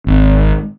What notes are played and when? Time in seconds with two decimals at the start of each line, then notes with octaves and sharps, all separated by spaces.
0.07 G#1